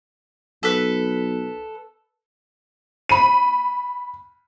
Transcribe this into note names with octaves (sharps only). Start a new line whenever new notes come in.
B1 A4 B4
B5 D#7